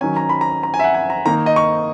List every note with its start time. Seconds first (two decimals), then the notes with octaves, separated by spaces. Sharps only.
0.01 D#3 F#3 C#4 G#5
0.16 A#5
0.29 B5
0.41 A#5
0.63 A#5
0.74 G#5
0.80 E5
0.84 F#5
0.94 G#5
1.10 A#5
1.26 D#3 A#3 D#4 A#5
1.46 D#5
1.56 C#6